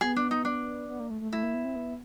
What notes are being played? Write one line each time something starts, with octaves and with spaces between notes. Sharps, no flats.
B3 G#4
D4
D#4
D4
B3
A#3
A3
A3
A3 E4
A#3
B3
C4
B3